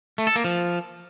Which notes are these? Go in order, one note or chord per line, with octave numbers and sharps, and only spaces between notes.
A3
A4
A#3
F3